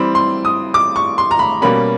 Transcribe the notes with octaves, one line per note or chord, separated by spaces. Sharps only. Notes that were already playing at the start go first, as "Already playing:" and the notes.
Already playing: E3 G3 C4 B5
C6
D#6
D6
C#6
C6
A#5
B5
B2 G3 A#3 C#4 B5